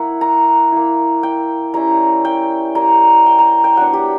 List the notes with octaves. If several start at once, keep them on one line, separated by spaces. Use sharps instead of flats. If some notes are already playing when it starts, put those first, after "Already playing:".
Already playing: A#3 E4 F#5
A#5
A#3 E4
G5
G3 C#4 E4 A#5
G5
G3 A#3 E4 A#5
G5
A#5
G5
F#3 B3 D4 F#5
G4